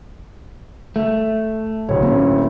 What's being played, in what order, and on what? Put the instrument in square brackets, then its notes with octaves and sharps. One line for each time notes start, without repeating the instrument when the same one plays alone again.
[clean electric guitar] A3
[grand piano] D1 C#5 [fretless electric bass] A#1
[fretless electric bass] A#3 B3 C#4